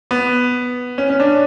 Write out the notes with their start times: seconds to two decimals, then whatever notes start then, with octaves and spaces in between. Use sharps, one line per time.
0.11 B3
0.98 C#4
1.10 C#4
1.20 D4